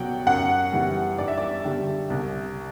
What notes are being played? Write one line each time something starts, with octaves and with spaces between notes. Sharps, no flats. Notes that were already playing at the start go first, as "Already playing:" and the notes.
Already playing: C2 B2 F#3 F#5 G5
F#2 F#5
E3 G3
G2 D5
E5
D5
D3 G3
C2